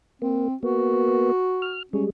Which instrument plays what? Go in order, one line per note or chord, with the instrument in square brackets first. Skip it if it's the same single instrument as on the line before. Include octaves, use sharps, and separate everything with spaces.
[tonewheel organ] A#3 [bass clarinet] C4
[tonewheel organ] A#3 B3 [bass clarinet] F#4
[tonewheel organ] F6
[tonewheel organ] G3 G#3 [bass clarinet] C#4